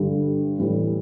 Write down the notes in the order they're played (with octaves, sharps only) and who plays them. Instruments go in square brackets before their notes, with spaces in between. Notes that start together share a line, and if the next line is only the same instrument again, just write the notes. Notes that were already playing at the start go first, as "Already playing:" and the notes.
Already playing: [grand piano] G2 D3 G3
A2 E3 G3